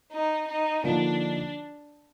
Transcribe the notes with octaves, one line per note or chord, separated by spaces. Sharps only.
D#4
D#4
D3 F3 A#3 D4 D#4